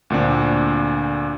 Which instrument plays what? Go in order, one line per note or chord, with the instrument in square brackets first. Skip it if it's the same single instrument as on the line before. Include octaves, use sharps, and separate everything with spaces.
[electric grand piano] D2 A#2 C4 D4